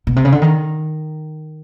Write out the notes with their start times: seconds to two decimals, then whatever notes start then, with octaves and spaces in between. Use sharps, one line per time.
0.07 B2
0.16 C3
0.25 C#3
0.32 D3
0.42 D#3